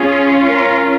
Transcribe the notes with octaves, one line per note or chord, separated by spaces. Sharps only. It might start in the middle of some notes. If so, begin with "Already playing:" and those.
Already playing: C#4 F4 G#4
A#4